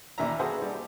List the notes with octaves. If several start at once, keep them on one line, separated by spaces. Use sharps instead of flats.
D#2 E3 D4 E5 A#5
F#4 G#4 A4 B4 C5 F#5
G3